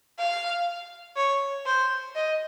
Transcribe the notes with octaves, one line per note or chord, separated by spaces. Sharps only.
F5
C#5
C5
D#5